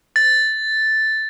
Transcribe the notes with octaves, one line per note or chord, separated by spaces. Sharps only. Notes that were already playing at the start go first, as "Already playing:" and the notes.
A6